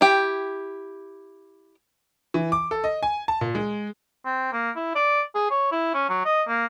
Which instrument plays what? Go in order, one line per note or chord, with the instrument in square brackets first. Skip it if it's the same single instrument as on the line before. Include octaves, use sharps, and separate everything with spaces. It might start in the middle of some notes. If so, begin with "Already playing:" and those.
[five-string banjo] E4 G4
[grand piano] E3
D6
A4
D#5
G#5
A5
A#2
G#3
[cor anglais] C4
A#3
E4
D5
G#4
C#5
E4
C#4
F#3
D#5
A#3